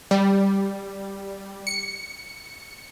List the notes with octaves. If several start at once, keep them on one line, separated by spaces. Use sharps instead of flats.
G3
C#7